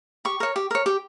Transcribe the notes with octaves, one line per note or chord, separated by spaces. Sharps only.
G4 C#6
A#4 C#5
G4
A#4 C#5
G4